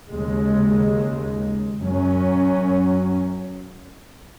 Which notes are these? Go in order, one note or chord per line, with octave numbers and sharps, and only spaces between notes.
D#2 C#3 G#3
F#2 F#3 C#4